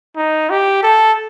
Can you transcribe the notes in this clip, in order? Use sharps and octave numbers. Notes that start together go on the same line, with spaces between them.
D#4
G4
A4